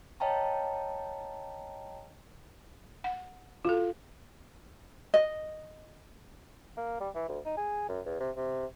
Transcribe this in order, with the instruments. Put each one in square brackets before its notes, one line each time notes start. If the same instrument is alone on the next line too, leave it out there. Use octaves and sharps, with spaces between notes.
[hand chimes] C#5 D#5 F5 G5 A5 A#5
[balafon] F#5
[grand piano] F4 [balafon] F#4 A4
[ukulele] D#5
[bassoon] A#3
G3
E3
D2
D#4
G#4
F#2
E2
C3
C3